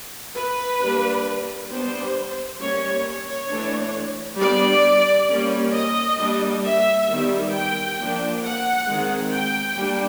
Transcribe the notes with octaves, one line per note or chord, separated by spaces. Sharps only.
B4
G3 A#3 D4
G3 B3 D4 C5
G3 A#3 C#4 C#5
C#5
E3 A3 D4
G3 B3 D4 D5
G3 A#3 C#4
D#5
G3 A#3 D4
E5
D#3 G3 B3
G5
F3 A#3 D4
F#5
D#3 G#3 C4
G5
G3 A#3 D4